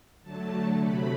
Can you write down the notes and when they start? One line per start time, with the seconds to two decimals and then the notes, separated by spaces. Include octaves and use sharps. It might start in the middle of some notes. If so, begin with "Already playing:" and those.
0.23 D3 F#3 A3 A5
0.79 C3 F#3 A3 B5